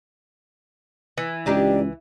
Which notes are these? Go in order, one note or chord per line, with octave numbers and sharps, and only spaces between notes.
E3
C#2 D4 D#4 G4 D5